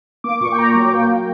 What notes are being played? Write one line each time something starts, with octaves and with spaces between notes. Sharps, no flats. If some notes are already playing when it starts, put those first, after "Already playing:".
A#3 D6
A#2 C#6
G5
A#2 A#5
F#3
A#3 G5
A#3